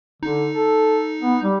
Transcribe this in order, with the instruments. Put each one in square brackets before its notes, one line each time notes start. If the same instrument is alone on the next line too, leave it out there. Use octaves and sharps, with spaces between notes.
[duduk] D3 [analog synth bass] D#4
[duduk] A4
B3
G3